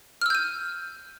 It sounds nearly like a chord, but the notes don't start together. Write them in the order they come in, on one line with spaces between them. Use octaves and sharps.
F6 E6 G6 D#7